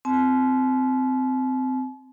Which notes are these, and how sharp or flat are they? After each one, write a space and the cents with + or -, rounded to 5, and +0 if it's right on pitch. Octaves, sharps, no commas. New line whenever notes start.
C4 -20 A5 -40